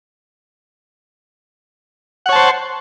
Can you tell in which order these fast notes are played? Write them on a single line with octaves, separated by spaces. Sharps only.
F#5 C#5 A5 C5